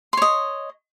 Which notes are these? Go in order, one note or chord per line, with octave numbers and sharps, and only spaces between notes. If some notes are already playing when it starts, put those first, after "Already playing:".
C#5 D#5 C6